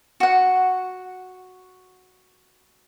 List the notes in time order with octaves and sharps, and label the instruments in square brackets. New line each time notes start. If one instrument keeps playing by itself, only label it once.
[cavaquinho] F#4 F#5